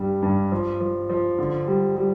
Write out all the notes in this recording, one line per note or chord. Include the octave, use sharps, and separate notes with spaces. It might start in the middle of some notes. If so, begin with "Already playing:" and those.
Already playing: G2 G3
G2
F3
F3
F3
D3
G3
G3